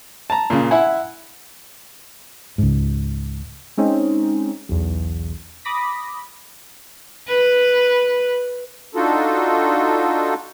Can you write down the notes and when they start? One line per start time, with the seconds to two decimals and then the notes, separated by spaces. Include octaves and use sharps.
0.30 A5 A#5
0.50 A#2 C#3
0.71 E4 E5 F#5 G#5
2.58 C#2 G#2
3.77 G#3 C4 C#4 D#4
4.69 B1 E2
5.65 B5 D6 D#6 A#6 B6
7.28 B4
8.95 D4 D#4 F4 F#4 A4